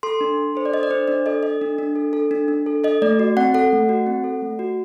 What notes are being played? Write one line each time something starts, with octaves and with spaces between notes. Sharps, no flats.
A4 C6
D4
D4
A4 C5
D5
A4 D#5
D5
D4 C5
D4 D5
A4 D#5
A4 D#5
D4
D4
A4
A4
D4
D4
A4
A4 D#5
A3 D5
F#4
C4 F#5
A4 F#5
A3
F#4
C4
A4
A3
F#4